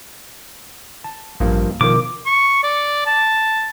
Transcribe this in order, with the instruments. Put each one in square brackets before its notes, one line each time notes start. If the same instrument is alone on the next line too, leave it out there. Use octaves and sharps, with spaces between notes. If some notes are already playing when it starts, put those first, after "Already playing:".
[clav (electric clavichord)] A5
[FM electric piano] A1 [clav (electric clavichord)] G2 F3 A#3
[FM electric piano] B2 A#4 [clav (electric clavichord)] D#3 F3 [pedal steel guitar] D6
[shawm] C#6
D5
A5